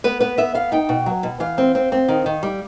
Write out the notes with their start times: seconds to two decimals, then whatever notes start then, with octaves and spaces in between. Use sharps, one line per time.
0.04 B3 B4
0.20 B3 B4
0.38 B3 E5
0.54 B3 F5
0.72 D#4 G5
0.89 B2
1.06 F#3
1.23 B2
1.40 E3 F5
1.58 C4
1.75 C4
1.92 C4
2.08 D#3
2.26 D#3
2.43 G3